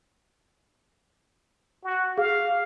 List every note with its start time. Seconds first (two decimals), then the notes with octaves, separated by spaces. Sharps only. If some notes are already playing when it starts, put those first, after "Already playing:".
1.84 F#4
2.18 G#4 F5